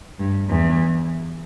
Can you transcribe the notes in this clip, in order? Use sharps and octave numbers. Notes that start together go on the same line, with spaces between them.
G2
E2